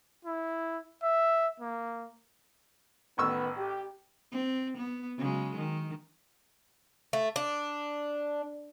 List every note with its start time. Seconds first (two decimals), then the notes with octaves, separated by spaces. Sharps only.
0.25 E4
1.03 E5
1.60 A#3
3.18 A1 D#3 B3 C#6 E6
3.57 G4
4.32 C4
4.77 B3
5.18 C#3 F#3 G#3
5.57 D#3
7.13 A3
7.36 D4